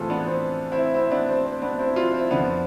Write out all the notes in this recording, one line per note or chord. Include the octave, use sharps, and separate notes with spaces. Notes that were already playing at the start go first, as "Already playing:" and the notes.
Already playing: A2 E3 C4 E4 F4 G#4 A4 B4
B3 D4
C4
C4 E4
C4 E4
B3 D4
C4
C4
B3 D4
C4 E4
D4 F4
C4 E4
F2 D3 F3 B3 D4